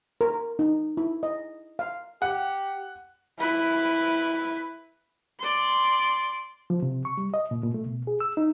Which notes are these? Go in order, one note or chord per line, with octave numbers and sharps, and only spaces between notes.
A#4
D#4
E4
D#5
F5
G4 F#5
E4 B4
D5 C6
F3
C3
C#6
G3
D#5
A#2
A#2
A3
B2
G#4
E6
D#4